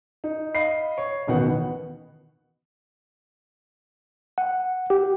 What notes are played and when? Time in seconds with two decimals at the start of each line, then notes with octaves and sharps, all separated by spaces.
0.24 D#4
0.55 D#5 F5 B5 C7
0.97 C#5
1.27 A1 D#2 B2 D#3 B3 F#5
4.38 F#5
4.90 G4